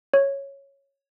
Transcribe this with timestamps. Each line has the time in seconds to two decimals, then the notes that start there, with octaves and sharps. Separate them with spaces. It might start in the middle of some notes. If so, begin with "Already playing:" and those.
0.14 C#5